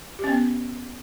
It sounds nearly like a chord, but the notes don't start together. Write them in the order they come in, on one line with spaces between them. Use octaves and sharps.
G4 C#4 B3